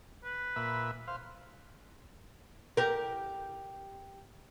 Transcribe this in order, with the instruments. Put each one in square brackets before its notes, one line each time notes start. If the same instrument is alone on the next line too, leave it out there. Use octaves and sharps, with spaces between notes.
[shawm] B4
[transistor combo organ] A#2 E5 B5
C5 F5
[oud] G4 A#4